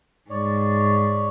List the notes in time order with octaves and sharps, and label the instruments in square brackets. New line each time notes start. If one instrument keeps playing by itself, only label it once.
[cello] G#2 [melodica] C#5 D5